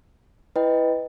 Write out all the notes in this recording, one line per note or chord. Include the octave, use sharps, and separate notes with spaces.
E4 B4 D#5 G5